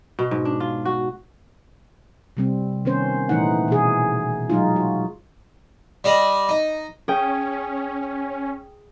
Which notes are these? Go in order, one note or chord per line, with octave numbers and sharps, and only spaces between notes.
B2
G#2
D4
F4
F#4
C3 G3 C4
D#3 B3 C#4 C5
A#2 E3 A3 D#4 F#5
B2 E3 G#4
F#3 G#3 D#4 F4
F#4
G3 D4 D#5
D#4
C#4 G#4 G5